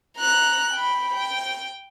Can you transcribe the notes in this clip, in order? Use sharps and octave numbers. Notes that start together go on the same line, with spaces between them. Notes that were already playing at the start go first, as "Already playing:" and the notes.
A#5 F#6
G5 B5
G5